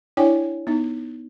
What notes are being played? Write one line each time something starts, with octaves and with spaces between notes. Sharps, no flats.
D4 E4 C#5 D5 G5 G#5
B3 D#4